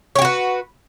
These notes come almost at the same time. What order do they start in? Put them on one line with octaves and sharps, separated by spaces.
C#5 G4 F#4 B4